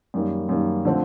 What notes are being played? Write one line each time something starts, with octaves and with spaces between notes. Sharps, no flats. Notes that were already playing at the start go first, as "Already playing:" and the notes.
F#2 D#3 G3 A#3
F#2 D#3 G3 A#3
D3 F3 A3 C4